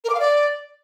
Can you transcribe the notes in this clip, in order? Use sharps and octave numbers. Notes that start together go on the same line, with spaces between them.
A#4
D6
F5
D5